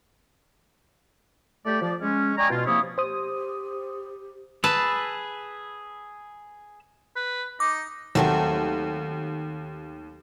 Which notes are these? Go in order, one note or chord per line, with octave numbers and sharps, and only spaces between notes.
A3 G4 D5
F3 D5
G#3 C#4
D5 D#5 G5 G#5 A#5 C#6
B2 F4
C3 F3 A#3 E4 C#5 D#6
G4 C5 D#6
G#4 B4 A5 B5 E6
B4
D#4 D6
D#2 F#3 A3 C4